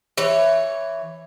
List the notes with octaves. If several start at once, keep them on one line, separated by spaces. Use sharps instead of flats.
E3 C#5